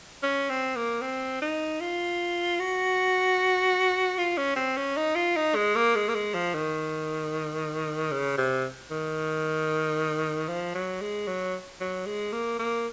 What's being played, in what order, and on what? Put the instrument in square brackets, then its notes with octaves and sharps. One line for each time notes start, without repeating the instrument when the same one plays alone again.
[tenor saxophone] C#4
C4
A#3
C4
D#4
F4
F#4
F4
C#4
C4
C#4
D#4
F4
D#4
G#3
A#3
G#3
A#3
G#3
F3
D#3
C#3
C3
D#3
F3
F#3
G#3
F#3
F#3
G#3
A#3
A#3